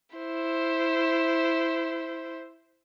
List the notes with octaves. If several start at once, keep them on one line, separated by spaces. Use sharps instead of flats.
E4 C5